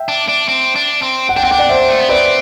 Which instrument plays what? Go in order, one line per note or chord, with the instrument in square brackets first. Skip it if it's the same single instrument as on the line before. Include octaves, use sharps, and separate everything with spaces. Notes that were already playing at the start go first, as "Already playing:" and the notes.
Already playing: [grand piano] E5 G5
[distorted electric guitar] D4
D4
C4
D4
C4
[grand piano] F#5
[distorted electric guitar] D4 [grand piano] G5
[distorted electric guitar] C4 [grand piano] F#5
[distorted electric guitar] D4 [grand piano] G5
[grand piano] D5 F#5
C5 E5
[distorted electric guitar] A3
B3
[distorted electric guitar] C4 [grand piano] B4 D5